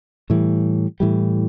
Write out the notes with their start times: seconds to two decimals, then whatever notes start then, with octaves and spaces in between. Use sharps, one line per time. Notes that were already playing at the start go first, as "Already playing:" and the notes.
0.30 A2 E3 G3
1.00 A2 E3 G3